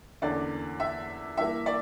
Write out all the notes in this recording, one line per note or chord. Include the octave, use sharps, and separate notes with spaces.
E2 D3 A#3 C#4 D5
E5
G2 E3 A#3 E5
D5